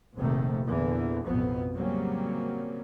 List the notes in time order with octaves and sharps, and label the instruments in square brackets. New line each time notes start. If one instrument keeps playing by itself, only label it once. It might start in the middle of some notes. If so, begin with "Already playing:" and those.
[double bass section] F1 A#1 C3 D#3 A3
E2 A#2 D3 E3
A1 F2 B2 B3
C#3 F#3 G3 A#3 C4 C#4